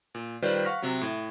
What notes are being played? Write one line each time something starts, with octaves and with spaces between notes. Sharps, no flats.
A#2
D#3 G3 F4 B4 C5 D5
F5 F#5 C#6 F6 A#6 B6
C3 F#3
A2